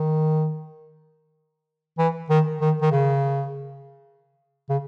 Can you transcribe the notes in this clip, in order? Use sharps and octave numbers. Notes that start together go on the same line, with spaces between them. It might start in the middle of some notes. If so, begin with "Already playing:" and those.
Already playing: D#3
E3
D#3
D#3
D#3
C#3
C#3